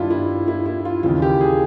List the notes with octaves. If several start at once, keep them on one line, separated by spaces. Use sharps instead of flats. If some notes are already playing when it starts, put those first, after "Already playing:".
Already playing: G2 D#3 E4 F4
E4
E4
E4
F4
D#2 C#3 E3 F4
G4
G#4